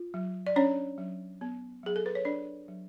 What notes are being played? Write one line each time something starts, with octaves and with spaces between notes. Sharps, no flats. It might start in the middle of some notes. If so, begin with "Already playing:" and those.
Already playing: F4
F#3
D5
C#4 D4 C#5
F#3
B3
F#3 G#4
A4
B4
C#5
D4 D5
F#3